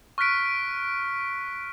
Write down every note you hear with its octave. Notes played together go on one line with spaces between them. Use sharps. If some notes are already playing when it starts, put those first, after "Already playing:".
C#6 F6 F#6 B6 D7